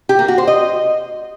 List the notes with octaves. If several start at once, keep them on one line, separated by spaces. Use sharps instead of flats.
G4
A#3
F#4
C5
D#5